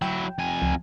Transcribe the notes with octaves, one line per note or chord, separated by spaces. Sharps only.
F#3 E4 G5
F2 G#5
C#2 F3